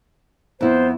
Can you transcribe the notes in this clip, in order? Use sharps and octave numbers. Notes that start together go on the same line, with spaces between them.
F2 B3 E4 C5